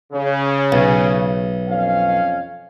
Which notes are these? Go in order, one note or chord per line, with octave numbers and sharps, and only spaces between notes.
C#3
B1
F2 C#4 F5